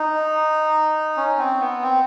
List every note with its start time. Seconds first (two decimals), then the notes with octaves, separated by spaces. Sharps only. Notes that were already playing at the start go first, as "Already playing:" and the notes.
Already playing: D#4
1.17 C#4
1.38 C4
1.60 B3
1.83 C4